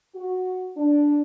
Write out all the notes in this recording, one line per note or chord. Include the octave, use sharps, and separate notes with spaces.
F#4
D4